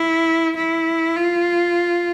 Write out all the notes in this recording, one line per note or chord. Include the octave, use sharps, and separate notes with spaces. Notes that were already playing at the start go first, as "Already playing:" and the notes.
Already playing: E4
E4
F4